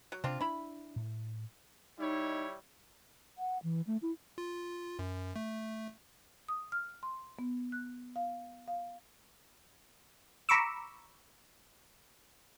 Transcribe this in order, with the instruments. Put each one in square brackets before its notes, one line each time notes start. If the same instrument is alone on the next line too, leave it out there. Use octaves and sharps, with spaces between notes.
[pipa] F#3
[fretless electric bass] C3 [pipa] C4 D4 F4
[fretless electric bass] D4 [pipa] E4 B5
[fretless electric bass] A2
[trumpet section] G3 E4 C#5 [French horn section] D#4
[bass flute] F#5
E3
A3
E4
[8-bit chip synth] F4
F#2
A3
[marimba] D#6
F6
C6
B3
F#6
F5
F5
[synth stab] A#5 B5 C#6 D6 E6